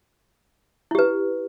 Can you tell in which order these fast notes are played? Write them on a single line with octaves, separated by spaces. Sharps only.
E4 G4 B4